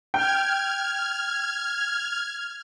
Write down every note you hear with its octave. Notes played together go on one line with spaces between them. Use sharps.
G5 F6 G#6